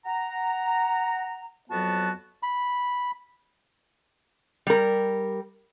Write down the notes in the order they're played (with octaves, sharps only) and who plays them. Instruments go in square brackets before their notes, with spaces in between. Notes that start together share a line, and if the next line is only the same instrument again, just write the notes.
[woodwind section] F#5 A#5
F2 F#3 B3 F#4 A5
[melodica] B5
[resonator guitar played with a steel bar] G3 A#4